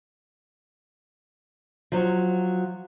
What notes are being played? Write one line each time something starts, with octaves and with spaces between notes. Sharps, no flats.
F3 F#3